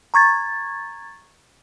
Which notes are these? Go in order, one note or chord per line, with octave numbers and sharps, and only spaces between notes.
A#5 C#6 G#6 A6